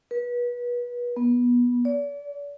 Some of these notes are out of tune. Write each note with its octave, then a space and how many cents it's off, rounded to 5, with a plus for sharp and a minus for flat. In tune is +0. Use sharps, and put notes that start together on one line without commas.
B4 -30
B3 -20
D5 -40